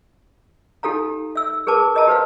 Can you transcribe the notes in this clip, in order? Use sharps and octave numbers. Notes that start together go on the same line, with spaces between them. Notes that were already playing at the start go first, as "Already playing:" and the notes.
D#4 G4 A4 F5 A#5
E5 E6
G#4 A#4 B4 A5 D6
A#4 D#5 E5 A5 A#5
G4 B4 C5 F5